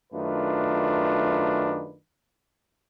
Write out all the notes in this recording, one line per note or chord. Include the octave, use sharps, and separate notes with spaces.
F#2 D#3 A3 D4 F4 B4